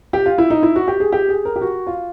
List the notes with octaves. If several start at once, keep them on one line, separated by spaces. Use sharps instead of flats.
G4
F4
E4
D#4
E4
F#4
G4
G#4
G4
G#4
A#4
G4
F#4
F4